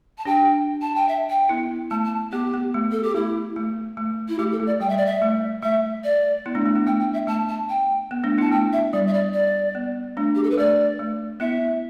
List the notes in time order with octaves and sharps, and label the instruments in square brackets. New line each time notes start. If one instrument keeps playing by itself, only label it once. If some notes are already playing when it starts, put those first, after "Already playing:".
[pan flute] A5
[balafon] D4 G4 [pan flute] G5
[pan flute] A5
G5
E5
G5
[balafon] B3 E4
[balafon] A3 [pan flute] A5
[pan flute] A5
[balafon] B3 [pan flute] G4
[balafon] B3
A3
[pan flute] A4
G4
[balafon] A3 [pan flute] E4
[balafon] A3
A3
[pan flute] E4
[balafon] A3 [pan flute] G4
[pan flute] A4
[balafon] A3
[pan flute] D5
[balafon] G3 [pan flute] G5
[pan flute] E5
D5
E5
[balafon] A3
[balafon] A3 [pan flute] E5
[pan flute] D5
[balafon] B3 E4
A3 D4
A3
B3
[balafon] A3 [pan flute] G5
[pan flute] G5
E5
[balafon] A3 [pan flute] A5
[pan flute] A5
G5
[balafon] B3
A3 D4
[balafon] B3 E4 [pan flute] A5
[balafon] A3 [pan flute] G5
[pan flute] E5
[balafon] G3 [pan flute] D5
[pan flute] E5
D5
D5
[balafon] B3
A3 D4
[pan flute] G4
A4
B4
[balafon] A3 [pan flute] D5
[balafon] A3
[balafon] B3 E4 [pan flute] E5